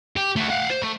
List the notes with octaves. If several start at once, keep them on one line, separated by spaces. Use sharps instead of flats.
G4
A3 F#4
F5 F#5
C5
A3